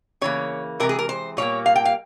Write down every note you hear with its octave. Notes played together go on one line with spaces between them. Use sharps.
C#3 E3 A#3 C#5
C3 E3 G#3 A#4
G#4
A#4
C5
A#2 G3 A#3 C#5
F5
G5
F5